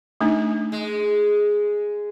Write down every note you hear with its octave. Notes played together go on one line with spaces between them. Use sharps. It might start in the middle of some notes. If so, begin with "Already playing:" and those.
A3 D4 D#4
G#3